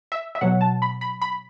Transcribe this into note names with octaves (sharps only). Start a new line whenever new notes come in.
E5
E5
B2 F#3 F#5
A5
B5
B5
B5